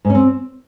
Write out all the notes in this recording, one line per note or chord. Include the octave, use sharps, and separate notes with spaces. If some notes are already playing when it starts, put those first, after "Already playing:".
G#2
C#4
C4